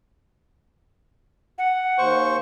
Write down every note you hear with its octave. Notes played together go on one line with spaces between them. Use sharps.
F#5
D#2 C5 C#6